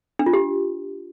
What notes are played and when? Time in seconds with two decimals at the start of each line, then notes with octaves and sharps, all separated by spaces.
0.19 D4
0.26 F4
0.33 G4